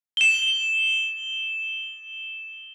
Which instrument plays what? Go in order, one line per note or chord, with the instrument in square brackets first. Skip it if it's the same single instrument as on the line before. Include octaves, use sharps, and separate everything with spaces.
[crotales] E7 G7